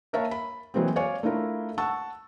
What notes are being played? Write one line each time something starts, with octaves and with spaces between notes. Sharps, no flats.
A#3 A#4 C#5 E5 F5 A5
B5
E3 F#3 G#3 A#3 C4
C#5 D5 F5 G#5
A3 D4 E4 F4 A#4
F#5 A5 C#6 E6